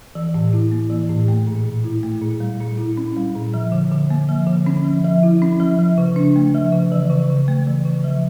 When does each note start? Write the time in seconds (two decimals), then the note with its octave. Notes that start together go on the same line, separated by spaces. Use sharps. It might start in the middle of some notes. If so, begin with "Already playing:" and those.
0.15 E3
0.34 A2
0.53 E4
0.72 A#3
0.90 E3
1.09 A2
1.28 A3
1.47 A#2
1.65 A#2
1.84 E4
2.03 A3
2.22 A#2
2.40 G3
2.60 A#2
2.78 E4
2.97 C#4
3.16 G3
3.35 A#2
3.54 F3
3.72 D3
3.92 D3
4.10 A#3
4.29 F3
4.47 D3
4.66 C#4
4.85 F3
5.04 F3
5.23 E4
5.42 C#4
5.60 F3
5.79 F3
5.98 C#3
6.16 D4
6.36 A3
6.54 F3
6.72 C#3
6.92 E3
7.10 C#3
7.30 C#3
7.48 A3
7.67 E3
7.85 C#3
8.04 F3